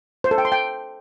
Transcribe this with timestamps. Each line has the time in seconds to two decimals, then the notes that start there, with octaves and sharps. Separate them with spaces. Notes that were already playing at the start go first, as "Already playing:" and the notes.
0.24 C5
0.31 A4
0.38 G5
0.45 C6
0.52 G5